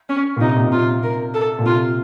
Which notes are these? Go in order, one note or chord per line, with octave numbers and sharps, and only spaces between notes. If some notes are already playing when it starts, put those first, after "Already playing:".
C#4
A#2
C3 D#4
A#2
A#2
C3 F4
A#4
A4
A#2
C3 F4